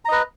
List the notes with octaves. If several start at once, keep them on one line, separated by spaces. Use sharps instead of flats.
B4 D#5 A#5